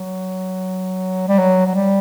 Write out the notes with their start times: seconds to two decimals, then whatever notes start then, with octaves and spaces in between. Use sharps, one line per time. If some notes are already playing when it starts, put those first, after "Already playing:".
Already playing: F#3
1.28 G3
1.39 F#3
1.66 F#3
1.75 G3